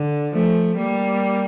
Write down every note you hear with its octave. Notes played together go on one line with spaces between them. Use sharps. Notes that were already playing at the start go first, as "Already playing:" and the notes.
Already playing: D3
F3 A3
G3 A#3